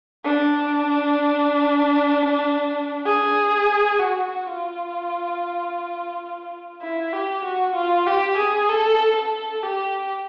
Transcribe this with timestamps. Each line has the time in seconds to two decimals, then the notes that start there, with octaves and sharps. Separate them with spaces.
0.24 D4
3.06 G#4
4.00 F#4
4.46 F4
6.81 E4
7.13 G4
7.44 F#4
7.75 F4
8.07 G4
8.37 G#4
8.69 A4
9.16 A4
9.63 G4